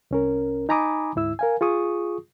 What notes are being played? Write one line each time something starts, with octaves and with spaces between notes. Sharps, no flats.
C2 C#4 A#4
D#4 G#5 A#5 B5 D6 D#6
D2 G#2 E4 E6
A#4 F5 G#5
F4 G#4 C#6 D#6